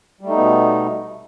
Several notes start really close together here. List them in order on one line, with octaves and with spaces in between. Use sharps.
G3 A3 D#4 B3 B2